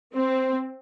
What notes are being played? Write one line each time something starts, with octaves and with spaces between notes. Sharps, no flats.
C4 C5